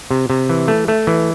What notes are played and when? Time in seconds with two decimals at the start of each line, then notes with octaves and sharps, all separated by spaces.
0.11 C3
0.30 C3
0.50 E3
0.68 A3
0.88 A3
1.07 E3